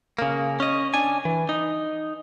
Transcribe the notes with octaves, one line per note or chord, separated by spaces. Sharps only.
C#3 A#3
C#4 D#5
D4 G#5
E3
D#4